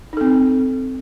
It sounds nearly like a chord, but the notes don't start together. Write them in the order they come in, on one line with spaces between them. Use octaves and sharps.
D#4 A4 C4